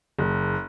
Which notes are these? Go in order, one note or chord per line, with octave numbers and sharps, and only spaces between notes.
F#1